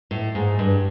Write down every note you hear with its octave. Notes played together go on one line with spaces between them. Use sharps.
A2
G#2
G2